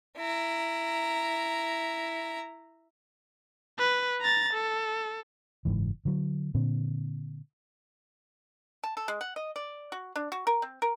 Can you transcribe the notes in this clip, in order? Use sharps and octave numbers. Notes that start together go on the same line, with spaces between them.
E4 A#5
B4
A#5 A6
A4
F#1 B1 G#2 E3
D3 F#3
A#2 D3 C4
A5
A4
G#3
F#5
D#5
D5
F#4
D4
F#4
A#4
C4
A#4